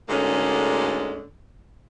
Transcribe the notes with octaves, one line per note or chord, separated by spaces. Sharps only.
D2 G#2 D3 G#3 A#3 C#4